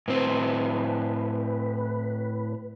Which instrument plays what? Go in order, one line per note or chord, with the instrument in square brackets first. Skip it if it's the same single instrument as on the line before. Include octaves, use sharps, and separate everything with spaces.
[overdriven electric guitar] A2 C4 [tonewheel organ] B4